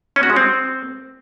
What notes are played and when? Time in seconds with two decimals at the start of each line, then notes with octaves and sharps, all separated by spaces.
0.16 C#4
0.23 F#4
0.30 G#3
0.36 C4